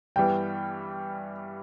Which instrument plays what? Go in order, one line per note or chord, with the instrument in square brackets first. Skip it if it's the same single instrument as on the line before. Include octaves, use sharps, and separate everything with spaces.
[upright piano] G2 E3 G3 B3 [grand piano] G5